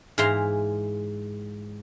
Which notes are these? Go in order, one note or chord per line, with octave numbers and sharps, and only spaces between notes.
G#2 E3 F5 A#5 C6